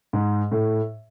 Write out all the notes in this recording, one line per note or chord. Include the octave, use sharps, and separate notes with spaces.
G#2
A2